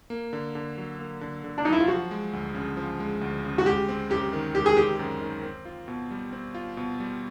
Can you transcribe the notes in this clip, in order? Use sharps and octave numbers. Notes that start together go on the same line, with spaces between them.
A#3
D3
D3
F#3
A#3
D3
D3
D4
F#3 D#4
E4
F4
F3 F#4
G#3
D2
C#3
F3
G#3
D2
C#3
F#4
G#3 G4
C4
F#2 G4
D#3
G#3 G4
G#4
C4 G4
F#2
D#3
C4
F4
B2
G3
C4
F4
B2
G3